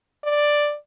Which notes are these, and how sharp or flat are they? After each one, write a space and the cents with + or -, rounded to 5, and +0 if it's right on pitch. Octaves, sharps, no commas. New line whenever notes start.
D5 +5